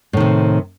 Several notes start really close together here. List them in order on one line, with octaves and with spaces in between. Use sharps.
A2 D#3 C3